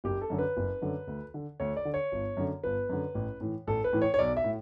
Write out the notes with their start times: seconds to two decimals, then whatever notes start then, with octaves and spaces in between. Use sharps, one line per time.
0.04 F#1 G4
0.21 A4
0.30 F#2 D3
0.38 B4
0.57 F#1
0.82 F#2 D3
1.07 D2
1.34 D3
1.60 D2 C#5
1.76 D5
1.85 D3
1.94 C#5
2.12 G1
2.37 F#2 D3
2.63 G1 B4
2.89 F#2 D3
3.15 A1
3.40 A2 E3
3.67 A1 A4
3.84 B4
3.93 A2 E3
4.02 C#5
4.14 C#5
4.19 B1 D5
4.37 E5
4.44 A2